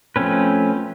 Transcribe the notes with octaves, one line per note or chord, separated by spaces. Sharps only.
F3 A3 C4 C#4 B4